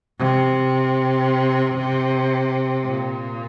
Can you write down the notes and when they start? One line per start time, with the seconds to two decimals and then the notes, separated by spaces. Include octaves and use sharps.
0.19 C3
2.86 A#2